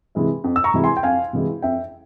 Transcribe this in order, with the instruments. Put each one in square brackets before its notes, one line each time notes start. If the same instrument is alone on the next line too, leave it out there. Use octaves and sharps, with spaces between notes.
[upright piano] C3 E3 G#3 E4
F2
[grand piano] E6
A#5 C#6
[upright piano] C3 E3 G#3 E4
[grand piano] G#5 C6
G5
[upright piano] F2 [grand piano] F5 G#5
[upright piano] C3 E3 G#3 E4
[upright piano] F2 [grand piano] E5 G5